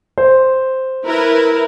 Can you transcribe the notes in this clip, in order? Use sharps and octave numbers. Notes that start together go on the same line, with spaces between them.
C5
E4 A#4 B4